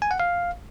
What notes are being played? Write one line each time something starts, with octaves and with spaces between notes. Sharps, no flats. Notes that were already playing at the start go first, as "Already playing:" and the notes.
G#5
F#5
F5